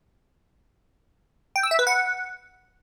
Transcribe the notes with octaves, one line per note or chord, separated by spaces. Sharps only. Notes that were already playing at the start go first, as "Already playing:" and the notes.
G5
E6
E5
B4
F#5